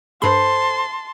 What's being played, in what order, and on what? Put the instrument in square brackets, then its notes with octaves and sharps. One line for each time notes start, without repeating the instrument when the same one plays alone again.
[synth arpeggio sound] G2 B5 [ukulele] A4 C5 [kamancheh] A5 C6